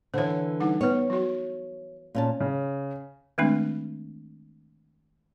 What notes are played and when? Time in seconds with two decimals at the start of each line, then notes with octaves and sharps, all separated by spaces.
0.14 D3 E3 C5 C#5
0.60 G3 D#4 F#5
0.81 B3 B4 C#5
1.10 F#3 F#4
2.15 A#2 C#4 A5
2.40 C#3
3.38 D#3 G#3 A3 C4 D4